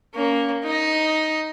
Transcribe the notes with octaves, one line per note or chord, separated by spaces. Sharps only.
A#3 C#4
D#4 D#5